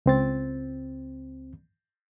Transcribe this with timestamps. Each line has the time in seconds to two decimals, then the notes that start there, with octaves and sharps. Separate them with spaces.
0.06 C#2 C4 A6